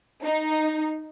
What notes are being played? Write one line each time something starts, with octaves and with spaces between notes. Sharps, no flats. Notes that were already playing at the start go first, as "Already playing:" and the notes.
D#4